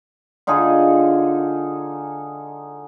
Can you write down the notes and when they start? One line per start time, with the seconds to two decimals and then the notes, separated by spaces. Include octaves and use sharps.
0.47 D3 D#4 F4 G#4